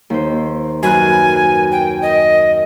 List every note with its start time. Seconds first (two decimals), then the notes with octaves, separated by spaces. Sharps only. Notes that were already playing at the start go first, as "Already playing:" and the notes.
0.10 D#2 C5
0.83 F#2 B4 G#5 F#6
1.72 G5
2.02 D#5